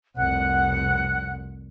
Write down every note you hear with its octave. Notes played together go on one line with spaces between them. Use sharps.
F1 C2 F#5 F#6